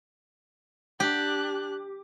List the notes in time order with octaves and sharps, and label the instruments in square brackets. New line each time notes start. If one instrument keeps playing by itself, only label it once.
[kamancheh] D4 F#6 [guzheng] G4